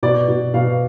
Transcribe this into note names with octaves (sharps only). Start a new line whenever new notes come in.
B2 D5
B2
B2 F5